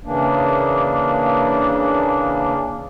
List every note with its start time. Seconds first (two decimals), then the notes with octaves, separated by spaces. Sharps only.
0.05 C#3 E3 A#3 D4